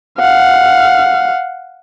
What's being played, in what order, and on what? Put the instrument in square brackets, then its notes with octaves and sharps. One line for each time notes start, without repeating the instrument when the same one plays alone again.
[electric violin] F5 F#5